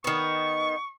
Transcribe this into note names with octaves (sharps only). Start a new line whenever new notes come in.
D#3 B3 C#6